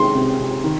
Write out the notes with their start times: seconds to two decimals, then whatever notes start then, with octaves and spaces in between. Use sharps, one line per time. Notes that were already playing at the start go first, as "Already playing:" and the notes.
Already playing: C3 G#3 D#4 C6
0.15 C3
0.40 C3
0.64 D#3